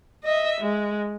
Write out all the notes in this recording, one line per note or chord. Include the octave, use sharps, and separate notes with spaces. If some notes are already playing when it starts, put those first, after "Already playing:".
D#5 E5
G#3